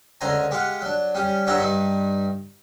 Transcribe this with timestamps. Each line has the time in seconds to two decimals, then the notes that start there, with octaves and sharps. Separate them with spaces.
0.21 C#2 D3 C5 G#5 A#5
0.51 G#3 G4 F5 F#5
0.82 F#3 D4
1.15 G3 C#4 G4
1.47 G2 F#3 G4 C#5 E5 A#5
1.59 G2 D#4